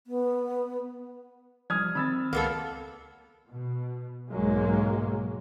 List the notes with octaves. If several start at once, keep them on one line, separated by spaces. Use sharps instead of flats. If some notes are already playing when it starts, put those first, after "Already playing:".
B3
F3 G3 D#6 F6 G#6
D#3 C4 B5 E6 A6
C#2 A#3 B3 A4
B2
B1 G#2 F#3 G#3 A#3